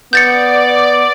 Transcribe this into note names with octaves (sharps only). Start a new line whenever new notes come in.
B3 D5 G6 A6 C#7